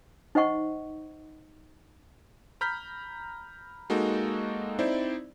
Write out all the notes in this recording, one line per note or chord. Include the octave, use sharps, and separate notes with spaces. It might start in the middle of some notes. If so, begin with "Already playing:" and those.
D#4 C5 D#5 F#5 C#6
A#5 B5 F6 G6 B6
G#3 A#3 D#4 F#4 A4
C4 D#4 E4 C5 D5